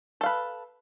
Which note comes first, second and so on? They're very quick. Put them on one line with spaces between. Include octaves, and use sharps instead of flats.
A4 F5 B4